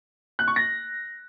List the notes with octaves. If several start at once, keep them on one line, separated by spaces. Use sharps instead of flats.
F#6
C#6
A#6